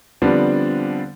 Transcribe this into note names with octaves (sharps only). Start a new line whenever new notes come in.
D3 F3 G3 B3 C4 D4